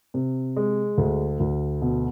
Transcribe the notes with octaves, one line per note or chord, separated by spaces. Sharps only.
C3
G#3
D2
D2
B2